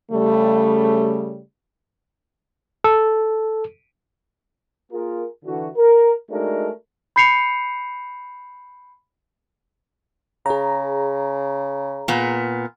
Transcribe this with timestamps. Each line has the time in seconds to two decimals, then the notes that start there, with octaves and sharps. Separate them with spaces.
0.12 C#3 G3 A3
2.84 A4
4.92 A#3 F4 G#4 A#4
5.45 D3 E3 F#4
5.77 A#4
6.30 G#3 A3 D4 D#4 F#4 A#4
7.16 B5 G6 C7 C#7 F7
10.46 C#3 G#4 A#5
12.08 A#2 B3